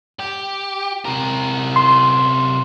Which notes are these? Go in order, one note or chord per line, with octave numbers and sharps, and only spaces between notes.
G4
C3 A#4
C6